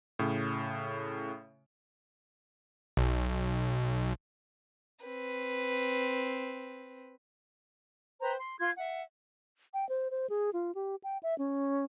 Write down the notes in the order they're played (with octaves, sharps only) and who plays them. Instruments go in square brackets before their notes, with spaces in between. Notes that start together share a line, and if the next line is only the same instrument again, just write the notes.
[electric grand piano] A2 C#3
[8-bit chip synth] B1
[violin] C4 B4
[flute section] B4 C5 G5 A#5
C6
F4 F5 C6 G#6
E5 F#5
[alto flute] G5
C5
C5
G#4
F4
G4
G5
E5
C#4